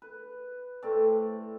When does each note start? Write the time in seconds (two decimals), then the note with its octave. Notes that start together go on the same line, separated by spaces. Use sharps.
0.02 B4
0.82 A2 A3 C4 D5